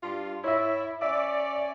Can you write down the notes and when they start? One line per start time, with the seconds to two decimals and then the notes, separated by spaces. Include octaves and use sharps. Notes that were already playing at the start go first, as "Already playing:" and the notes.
0.03 G2 F4
0.44 E4 C#5 E5
1.02 C#4 D5 E5